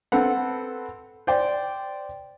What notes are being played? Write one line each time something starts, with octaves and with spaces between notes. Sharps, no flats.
C4 A4 B4 F#5
C5 D5 G5